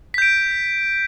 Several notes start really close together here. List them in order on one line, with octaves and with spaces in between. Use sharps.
B6 G6 D7